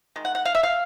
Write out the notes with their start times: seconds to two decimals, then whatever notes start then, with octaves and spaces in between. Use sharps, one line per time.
0.16 D#3 G#3
0.25 F#5
0.35 F#5
0.45 F5
0.55 E5
0.63 F5